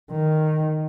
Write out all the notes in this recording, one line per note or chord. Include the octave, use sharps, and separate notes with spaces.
D#3